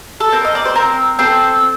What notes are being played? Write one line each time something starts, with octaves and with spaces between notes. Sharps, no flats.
A4
C4 A#4
D#5
D5
C5
C4 A#4
C4 A4 C5